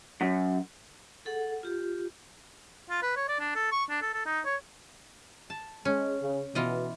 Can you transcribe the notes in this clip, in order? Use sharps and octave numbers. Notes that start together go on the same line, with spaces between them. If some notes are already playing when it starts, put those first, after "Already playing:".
F#2
G#4 A4 F#5
F4 G4
F4
B4
C#5
D5
D4
A4
C#6
D4
A4
A4
D#4
C#5
A5
G#3 C#4
C#3
B2 E3 F4 D#5